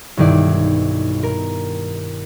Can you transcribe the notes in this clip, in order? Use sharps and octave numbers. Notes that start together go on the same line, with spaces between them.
B1 G2 D#3 E4 D5
A#4